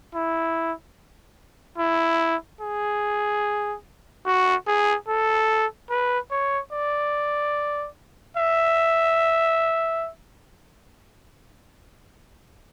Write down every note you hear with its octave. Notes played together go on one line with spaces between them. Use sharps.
E4
E4
G#4
F#4
G#4
A4
B4
C#5
D5
E5